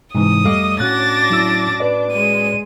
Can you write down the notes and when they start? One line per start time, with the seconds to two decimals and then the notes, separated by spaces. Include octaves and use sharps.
0.15 G#2 C3 E3 D#6
0.44 F2 G3 A3 A4 D#5 F5 D6
0.80 A2 C#4 D4 F#4 D6 F#6 A6 A#6
1.30 F#3 E4 E6
1.80 B4 D5
2.12 G#3 D#7